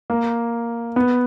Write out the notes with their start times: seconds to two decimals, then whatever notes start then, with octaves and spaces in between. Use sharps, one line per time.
0.10 A#3
0.96 B3